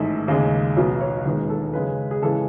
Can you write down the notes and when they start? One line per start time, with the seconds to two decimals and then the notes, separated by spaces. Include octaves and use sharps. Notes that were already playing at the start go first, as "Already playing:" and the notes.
Already playing: A1 G#2 D#3 A3 E5
0.28 D#2 C#3 G#3
0.77 B1 B2 F#3 B3 C#5
1.01 C#5
1.25 E1 D#2 D#3 G#3 B3
1.50 A4
1.73 F#2 C#3 G#3 C#4 B4
2.11 G#4
2.22 C#3 E3 G#3 A4